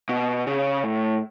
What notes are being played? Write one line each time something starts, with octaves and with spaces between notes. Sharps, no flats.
B2
C#3
A2